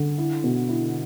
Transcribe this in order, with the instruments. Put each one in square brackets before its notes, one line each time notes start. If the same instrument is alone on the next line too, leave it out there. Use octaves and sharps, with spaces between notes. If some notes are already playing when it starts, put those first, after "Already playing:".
Already playing: [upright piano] D3
E4
B2
E4